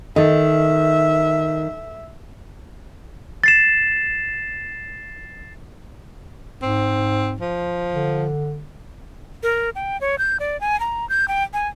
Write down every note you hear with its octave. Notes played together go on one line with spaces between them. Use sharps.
D#3 A4 D#5 E5
A6 C7 E7
G#2 C4
F3
D3
A#4
G5
C#5
G6
D5
G#5
A#5
G6
G5
G#5